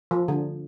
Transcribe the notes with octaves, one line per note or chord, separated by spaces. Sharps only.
F3
D3